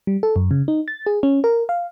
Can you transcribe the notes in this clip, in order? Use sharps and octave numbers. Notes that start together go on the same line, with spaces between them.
G3
A4
F#2
C#3
D#4
A6
G#4
C#4
A#4
F5